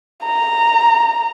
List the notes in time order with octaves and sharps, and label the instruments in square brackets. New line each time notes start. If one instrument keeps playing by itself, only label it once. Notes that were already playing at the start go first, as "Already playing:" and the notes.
[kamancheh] A#5